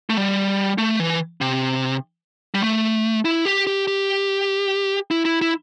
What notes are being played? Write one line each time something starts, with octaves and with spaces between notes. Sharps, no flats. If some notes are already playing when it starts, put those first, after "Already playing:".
A3
G3
A3
E3
C3
G3
A3
E4
G4
G4
G4
E4
E4
E4